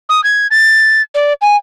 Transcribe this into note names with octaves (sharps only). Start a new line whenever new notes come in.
D#6
G#6
A6
D5
G#5